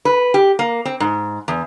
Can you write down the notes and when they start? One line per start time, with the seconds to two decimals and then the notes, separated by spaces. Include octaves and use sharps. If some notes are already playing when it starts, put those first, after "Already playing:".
0.05 B4
0.34 G4
0.59 A#3
0.85 C4
1.00 G#2
1.48 E2